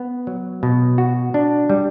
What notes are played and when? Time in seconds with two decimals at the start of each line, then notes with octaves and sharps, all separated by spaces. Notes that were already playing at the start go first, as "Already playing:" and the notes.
Already playing: B3
0.27 F#3
0.63 B2
0.98 F#4
1.34 D4
1.70 G3